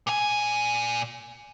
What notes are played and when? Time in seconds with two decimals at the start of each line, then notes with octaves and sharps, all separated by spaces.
0.07 A#2 G#5